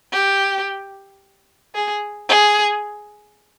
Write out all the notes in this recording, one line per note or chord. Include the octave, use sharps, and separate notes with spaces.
G4
G#4
G#4